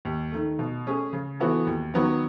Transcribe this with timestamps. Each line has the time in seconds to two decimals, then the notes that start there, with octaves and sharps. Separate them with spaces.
0.05 D#2
0.32 D#3 A3
0.59 B2
0.86 A3 C#4 G#4
1.13 C#3
1.40 E3 B3 F#4 A4
1.67 D#2
1.94 D#3 F#3 B3 F#4